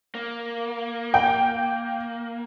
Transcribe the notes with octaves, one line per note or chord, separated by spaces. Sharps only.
A#3
G5